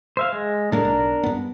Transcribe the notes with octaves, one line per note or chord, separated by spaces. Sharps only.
C5 E5 F5
G#3
A2 G#3 A#3 D4 A#4
B1
G2 B3